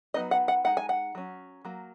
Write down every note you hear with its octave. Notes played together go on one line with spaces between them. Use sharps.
F#3 B3 D#4 D#5
F#5
F#5
G#3 D#4 F#5
G#5
F#5
F#3 C#4
F#3 A#3